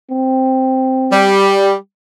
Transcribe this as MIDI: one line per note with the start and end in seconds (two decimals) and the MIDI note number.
0.11 1.38 60
1.12 1.73 55